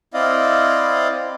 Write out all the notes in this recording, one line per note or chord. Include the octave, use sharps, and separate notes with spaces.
C4 E4 D5 D#5 F5